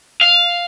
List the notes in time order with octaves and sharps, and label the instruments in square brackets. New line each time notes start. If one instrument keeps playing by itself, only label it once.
[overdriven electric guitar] F5